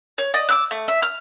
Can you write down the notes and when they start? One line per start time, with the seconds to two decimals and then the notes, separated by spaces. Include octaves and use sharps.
0.18 C#5
0.34 D5 D#5
0.49 D6 E6 F#6
0.71 A3
0.88 E5
1.02 F6